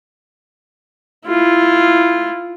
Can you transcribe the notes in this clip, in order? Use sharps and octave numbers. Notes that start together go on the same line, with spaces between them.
E4 F4